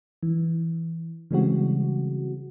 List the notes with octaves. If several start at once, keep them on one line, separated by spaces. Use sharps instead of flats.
E3
C#3 E3 G3 G#3 C4 F#4